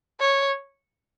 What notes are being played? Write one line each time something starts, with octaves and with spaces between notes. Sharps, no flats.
C#5